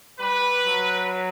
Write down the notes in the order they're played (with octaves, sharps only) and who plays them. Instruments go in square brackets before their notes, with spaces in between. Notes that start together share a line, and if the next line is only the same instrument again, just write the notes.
[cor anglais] G3 [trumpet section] B4
[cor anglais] F#3